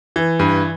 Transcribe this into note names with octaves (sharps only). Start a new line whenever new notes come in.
E3
G2